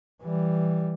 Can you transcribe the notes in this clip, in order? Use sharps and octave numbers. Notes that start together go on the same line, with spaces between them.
E3 G3